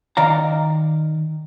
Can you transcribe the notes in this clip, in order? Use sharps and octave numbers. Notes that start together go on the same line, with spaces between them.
D#3 D5 F5 A#5